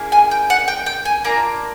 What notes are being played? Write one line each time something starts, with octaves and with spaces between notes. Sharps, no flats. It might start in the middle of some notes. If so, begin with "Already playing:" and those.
Already playing: A#3 C#4 E4 G#4
G#5
G5
F#5
G5
G5
G#5
A#3 D4 F4 A#5